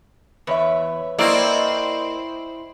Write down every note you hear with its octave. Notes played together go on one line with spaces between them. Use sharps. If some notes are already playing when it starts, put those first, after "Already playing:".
E2 B4 C#5 E5
A#3 C4 E4 D5 D#5 C#6